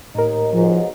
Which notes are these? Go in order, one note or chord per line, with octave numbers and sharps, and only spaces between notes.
D#2 A2 D#4 A#4
B1 G#2 F3